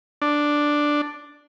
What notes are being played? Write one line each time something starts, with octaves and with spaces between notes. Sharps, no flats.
D4